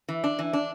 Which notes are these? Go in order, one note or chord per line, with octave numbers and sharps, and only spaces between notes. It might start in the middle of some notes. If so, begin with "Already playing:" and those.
E3
D4
E3
D4